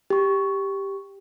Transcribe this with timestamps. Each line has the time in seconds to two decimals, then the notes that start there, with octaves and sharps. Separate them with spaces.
0.10 G4 C#6